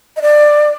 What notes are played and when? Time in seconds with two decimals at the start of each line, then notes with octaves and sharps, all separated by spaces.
0.17 D#5
0.22 D5